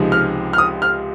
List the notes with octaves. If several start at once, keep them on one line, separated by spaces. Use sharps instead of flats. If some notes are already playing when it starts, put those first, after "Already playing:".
Already playing: C#2 C3 F3 G#3 D#4
F6
F6
D#6
F6